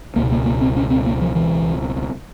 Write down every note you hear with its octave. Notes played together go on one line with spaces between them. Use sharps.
C#2 B2 A#3
A#3
A#3
C4
C#4
C4
A#3
F3
E3